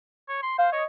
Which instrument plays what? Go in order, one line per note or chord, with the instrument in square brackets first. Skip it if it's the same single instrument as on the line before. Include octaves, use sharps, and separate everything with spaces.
[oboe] C#5
C6
[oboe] C5 [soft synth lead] F5
[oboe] C#5 [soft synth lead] D#5